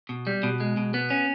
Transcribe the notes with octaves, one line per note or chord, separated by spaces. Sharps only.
B2
G3
B2
G#3
B2
B3
C#4